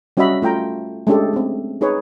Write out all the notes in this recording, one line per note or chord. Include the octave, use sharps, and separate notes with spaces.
G3 C#4 F#4 D#5 E5 B5
A3 F4 G5 A#5
G#3 A3 C#4 D4 G4 A4
A3 C4
D#4 G#4 B4 C#5